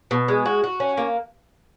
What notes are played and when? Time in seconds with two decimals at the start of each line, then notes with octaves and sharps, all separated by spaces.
0.11 B2
0.28 G#3
0.46 F#4
0.64 F#4
0.80 C#4
0.97 A#3